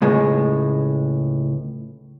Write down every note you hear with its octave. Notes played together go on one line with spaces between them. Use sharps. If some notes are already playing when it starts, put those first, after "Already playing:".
C#2 A2 G#3